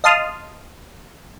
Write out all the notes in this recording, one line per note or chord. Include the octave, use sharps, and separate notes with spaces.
D#5 F5 A5 C6 D#6 F6